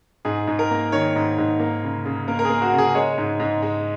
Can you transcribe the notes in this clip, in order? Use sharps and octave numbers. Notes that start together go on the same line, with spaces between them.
G#2 G#4
G#2
A#4
A#3
D#3 C#5
G#2
G#2
A#3
C#3
C#3
A#3 A#4
A#4
A#3 G#4
F#4
C#3
G#4
G#3 C#5
G#2
G#2
G#3